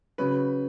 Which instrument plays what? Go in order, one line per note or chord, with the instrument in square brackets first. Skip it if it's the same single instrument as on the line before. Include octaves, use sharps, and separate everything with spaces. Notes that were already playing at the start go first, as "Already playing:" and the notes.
[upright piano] C#3 F#3 B4